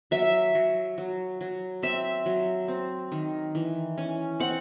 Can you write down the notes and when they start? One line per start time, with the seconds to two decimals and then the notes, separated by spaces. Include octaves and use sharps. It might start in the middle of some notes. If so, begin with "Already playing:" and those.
0.11 F#3 E5
0.55 F#3
0.98 F#3
1.41 F#3
1.82 C4 E5
2.26 F#3
2.68 C4
3.12 D#3
3.55 E3
3.98 C#4
4.40 C4 F#5